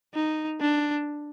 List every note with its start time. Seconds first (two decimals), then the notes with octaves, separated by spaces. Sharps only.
0.14 D#4
0.61 D4